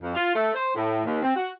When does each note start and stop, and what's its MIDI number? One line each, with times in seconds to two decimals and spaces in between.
0.01 0.12 41
0.15 0.33 65
0.35 0.50 57
0.53 0.71 72
0.75 1.01 45
1.05 1.22 39
1.22 1.32 60
1.36 1.49 66